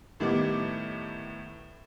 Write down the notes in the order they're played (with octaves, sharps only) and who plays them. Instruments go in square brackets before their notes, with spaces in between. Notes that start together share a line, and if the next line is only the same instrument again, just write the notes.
[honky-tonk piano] A2 D#3 G3 B3 D6